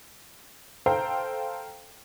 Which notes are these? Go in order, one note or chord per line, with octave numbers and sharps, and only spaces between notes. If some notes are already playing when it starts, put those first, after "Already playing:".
A4 C5 F5 G5 A#5